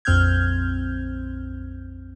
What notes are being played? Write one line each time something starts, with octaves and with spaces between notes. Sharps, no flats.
A#1 F2 C4 F6 G6 G#6